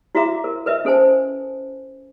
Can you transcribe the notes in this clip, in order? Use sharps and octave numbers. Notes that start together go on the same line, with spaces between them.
E4 F#4 E5 F5 A#5 D6
A#4
A#4 B4 D#5 E5
C#4 A4 C5 G#5 A5